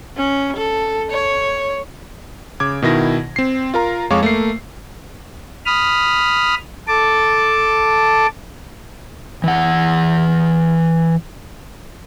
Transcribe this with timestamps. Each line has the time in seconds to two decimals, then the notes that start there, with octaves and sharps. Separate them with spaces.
0.17 C#4
0.56 A4
1.11 C#5
2.60 C#3 D6 G#6
2.82 B2 D#3 E4 A#6
3.36 C4 C7
3.74 F4 A#4 A#5
4.10 F2 G#3 C#5 F5 C#6 D6
4.23 A3 A#3 C7
5.66 B5 D#6 F6
6.88 A4 A5 D6
9.44 E3 F#5